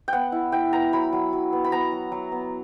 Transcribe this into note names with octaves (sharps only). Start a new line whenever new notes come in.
B3 F#5 G5
E4
E4 G5
B3 A#5
F#3 B5
F#3
F#3
B3
B5
B3 A#5
F#3
F#3
B3